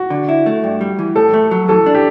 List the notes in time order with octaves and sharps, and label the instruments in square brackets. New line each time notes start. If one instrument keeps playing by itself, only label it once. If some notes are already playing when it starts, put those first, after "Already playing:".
Already playing: [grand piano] F#4
[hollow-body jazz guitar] D3
E4
A3
G2
G3
E3
[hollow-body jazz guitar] A2 [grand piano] A4
[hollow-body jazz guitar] A3
F#3
[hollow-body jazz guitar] E3 [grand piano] A4
[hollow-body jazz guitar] D4
[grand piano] G4